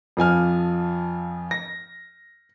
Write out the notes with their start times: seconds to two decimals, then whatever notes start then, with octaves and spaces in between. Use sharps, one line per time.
0.17 F2 F3 G#5 F6
1.51 A#6